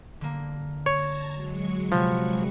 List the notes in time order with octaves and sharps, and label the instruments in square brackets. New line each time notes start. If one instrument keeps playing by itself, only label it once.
[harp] D3 A#3
[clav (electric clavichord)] C#5 [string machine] A5 A#5 G#6
[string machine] F#3 G#3 C#6
[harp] C3 B3 [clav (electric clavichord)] F3